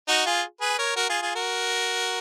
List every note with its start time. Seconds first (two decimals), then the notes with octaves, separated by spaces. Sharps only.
0.08 D#4 F#4
0.26 F4 G#4
0.61 G#4 B4
0.78 A#4 C#5
0.96 F#4 A#4
1.09 F4 G#4
1.22 F4 G#4
1.35 F#4 A#4